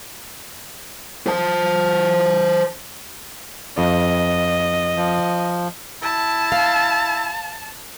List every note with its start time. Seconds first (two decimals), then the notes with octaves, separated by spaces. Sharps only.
1.27 C5 A5
3.78 F2 D#5
4.97 F3
6.03 E4 A5
6.52 F5